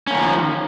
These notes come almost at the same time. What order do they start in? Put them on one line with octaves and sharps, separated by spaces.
C#4 A#3 D#3 F3